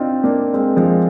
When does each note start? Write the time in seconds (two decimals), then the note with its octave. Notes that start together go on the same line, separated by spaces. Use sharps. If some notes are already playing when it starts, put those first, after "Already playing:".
Already playing: C4 D4 D#4 F4
0.23 A#3 D4
0.54 G#3 C4
0.76 F3 G#3